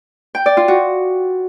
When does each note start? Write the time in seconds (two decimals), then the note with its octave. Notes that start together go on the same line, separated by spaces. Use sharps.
0.35 G5
0.46 D5
0.57 F4
0.68 F#4